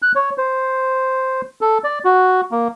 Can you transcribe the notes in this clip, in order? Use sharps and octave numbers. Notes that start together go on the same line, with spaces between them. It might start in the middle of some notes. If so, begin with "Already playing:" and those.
F#6
C#5
C5
A4
D5
F#4
A#3